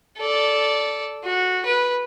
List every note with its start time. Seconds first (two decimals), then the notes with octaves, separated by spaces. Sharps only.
0.18 A4 D5
1.24 F#4
1.65 B4